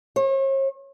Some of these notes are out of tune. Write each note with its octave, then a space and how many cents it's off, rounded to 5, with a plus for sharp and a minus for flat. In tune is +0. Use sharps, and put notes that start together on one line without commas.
C#5 -45